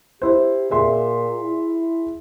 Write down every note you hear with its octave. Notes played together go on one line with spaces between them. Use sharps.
E4 G4 C5
A#2 G#4 E5 C6
E4